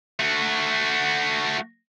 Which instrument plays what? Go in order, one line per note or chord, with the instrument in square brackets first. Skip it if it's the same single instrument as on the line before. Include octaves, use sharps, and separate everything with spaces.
[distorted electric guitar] A3 F#4